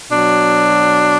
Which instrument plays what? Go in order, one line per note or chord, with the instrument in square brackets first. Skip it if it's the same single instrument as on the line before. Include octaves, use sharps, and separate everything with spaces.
[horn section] B2 F#3 D4